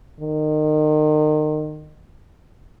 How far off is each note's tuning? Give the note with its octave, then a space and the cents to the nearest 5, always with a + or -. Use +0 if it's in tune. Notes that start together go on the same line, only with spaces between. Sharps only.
D#3 -30